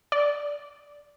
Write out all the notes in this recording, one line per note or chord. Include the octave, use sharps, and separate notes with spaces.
D5